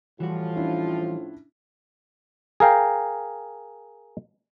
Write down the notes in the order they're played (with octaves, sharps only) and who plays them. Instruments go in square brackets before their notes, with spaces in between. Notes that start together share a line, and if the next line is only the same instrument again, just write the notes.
[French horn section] A2 F3 F4 [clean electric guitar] E3 G3 F#4
[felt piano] C#4 D4 E4
[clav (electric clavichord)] G#4 A#4 F5 G5